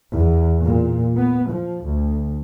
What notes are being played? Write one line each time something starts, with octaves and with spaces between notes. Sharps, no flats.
E2
A#2
B3
F3
D2